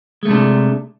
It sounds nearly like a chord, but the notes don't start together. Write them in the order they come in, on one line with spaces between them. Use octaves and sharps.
G#3 A3 C3 D4